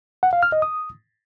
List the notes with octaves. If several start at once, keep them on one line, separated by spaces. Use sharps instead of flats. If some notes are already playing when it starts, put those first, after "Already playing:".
F#5
F5
F6
D#5
D#6